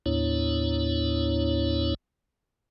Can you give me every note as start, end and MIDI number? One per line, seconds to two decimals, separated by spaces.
0.06 1.94 39
0.06 1.94 45
0.06 1.94 59
0.06 1.94 62
0.06 1.94 64
0.06 1.94 73